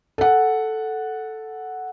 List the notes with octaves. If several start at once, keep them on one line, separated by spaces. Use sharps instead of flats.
A4 F#5